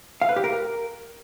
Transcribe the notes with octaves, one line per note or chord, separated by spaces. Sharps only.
F5
B4
G4
A#4